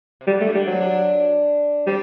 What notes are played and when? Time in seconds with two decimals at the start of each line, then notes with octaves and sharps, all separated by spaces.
0.21 C3
0.27 D3 G3
0.41 A#2 A3
0.54 D3 G3
0.67 F#3 C4
0.81 D4
1.87 G3 C4